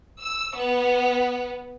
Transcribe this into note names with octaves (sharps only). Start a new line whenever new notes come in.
E6
B3